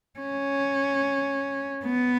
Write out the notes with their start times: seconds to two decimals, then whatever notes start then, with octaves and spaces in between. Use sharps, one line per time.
0.20 C#4
1.86 B3